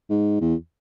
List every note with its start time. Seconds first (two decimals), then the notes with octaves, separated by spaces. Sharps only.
0.10 G#2
0.41 E2